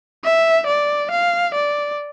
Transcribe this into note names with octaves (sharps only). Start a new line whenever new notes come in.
E5
D5
F5
D5